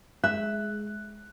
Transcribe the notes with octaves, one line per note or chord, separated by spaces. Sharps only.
G#3 E5 F#6